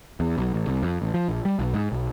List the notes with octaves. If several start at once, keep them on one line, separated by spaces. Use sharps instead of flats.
E2
B1
A1
C2
F2
A1
F3
A#1
G3
B1
G#2
B1